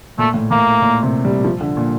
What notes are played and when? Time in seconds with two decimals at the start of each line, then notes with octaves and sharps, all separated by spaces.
0.18 A#2 A3
0.34 A2
0.51 A2 A#3
0.82 A#2
1.03 C3
1.25 G3
1.44 F3
1.61 D3
1.77 A#2